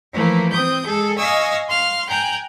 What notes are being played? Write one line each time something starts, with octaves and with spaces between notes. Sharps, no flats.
E3 F3 A3 A#3
C4 D#6 G6
G#3 G#4 A4
D#5 F5 G#5 C#6 D#6 E6
F5 C6 F6
G5 G#5 A#5 F#6 G6